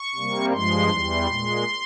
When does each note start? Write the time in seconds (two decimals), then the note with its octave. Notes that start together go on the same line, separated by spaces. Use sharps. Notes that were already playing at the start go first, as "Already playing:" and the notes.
Already playing: C#6
0.15 C3 G3 A#3
0.52 G2 F3 G#3 C6
0.90 E2 E3 G3
1.27 A#2 G#3